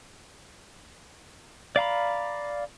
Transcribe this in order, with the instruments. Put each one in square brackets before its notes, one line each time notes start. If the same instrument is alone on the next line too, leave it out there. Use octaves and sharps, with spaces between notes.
[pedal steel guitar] D5 F5 A#5 B5